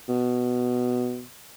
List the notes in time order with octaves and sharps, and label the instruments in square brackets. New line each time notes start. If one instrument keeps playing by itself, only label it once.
[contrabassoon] B2